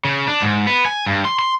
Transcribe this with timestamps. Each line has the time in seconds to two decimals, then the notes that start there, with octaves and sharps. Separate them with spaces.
0.05 C#3
0.28 D4
0.42 G#2
0.67 B3
0.86 G#5
1.06 G2
1.25 C6
1.39 C6